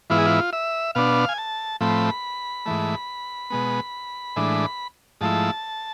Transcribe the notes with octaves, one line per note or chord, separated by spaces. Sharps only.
G#2 E3 B3 E4 F4
G#4
F4
E5
B2 B3 D4 F5
G#5
A5
A2 F3 A3 C4 B5
G#2 E3 A3
B2 G#3 B3
A2 E3 G#3 D4
G#2 F3 A3 E4 A5